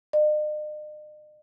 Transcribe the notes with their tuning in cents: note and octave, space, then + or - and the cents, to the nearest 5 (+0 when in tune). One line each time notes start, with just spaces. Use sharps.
D#5 -45